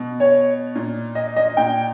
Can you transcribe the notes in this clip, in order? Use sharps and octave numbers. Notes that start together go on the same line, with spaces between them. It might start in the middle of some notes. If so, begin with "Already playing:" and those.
Already playing: B2
C#5
A#2
D#5
D#5
A#2 G5